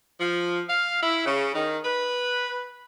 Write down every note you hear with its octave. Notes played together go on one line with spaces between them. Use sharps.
F3
F5
E4
C#3
D#3
B4